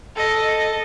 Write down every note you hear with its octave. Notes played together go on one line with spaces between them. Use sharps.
A4 D#5